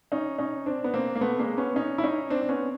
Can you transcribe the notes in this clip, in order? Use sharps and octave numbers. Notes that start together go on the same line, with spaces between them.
C#4 D#4
C#4 D#4
C4 D4
B3
A#3 C4
A#3
A3 B3
G#3 A#3
B3 C#4
C#4 D#4
E4
C#4 D#4
C4 D4
D4
B3 C#4